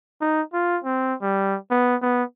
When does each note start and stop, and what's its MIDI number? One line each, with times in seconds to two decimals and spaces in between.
0.21 0.42 63
0.53 0.78 65
0.85 1.14 60
1.22 1.57 55
1.71 1.96 59
2.02 2.24 59